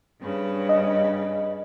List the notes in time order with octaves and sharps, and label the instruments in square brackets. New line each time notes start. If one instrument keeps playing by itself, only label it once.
[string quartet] G2 C#3 B4
[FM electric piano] D#5